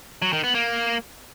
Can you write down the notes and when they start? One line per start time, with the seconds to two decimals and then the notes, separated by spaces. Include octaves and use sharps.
0.22 F#3
0.33 D#3
0.44 B3
0.55 A#3